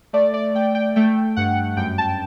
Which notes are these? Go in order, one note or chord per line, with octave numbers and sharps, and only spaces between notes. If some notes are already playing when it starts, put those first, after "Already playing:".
A3 D5
D5
A3 G5
G5
A3 G5
G2 F#5
F#2 G5
A5